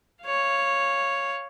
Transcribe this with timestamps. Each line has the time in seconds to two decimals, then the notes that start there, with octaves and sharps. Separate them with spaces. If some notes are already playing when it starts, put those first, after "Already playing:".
0.24 C#5 F5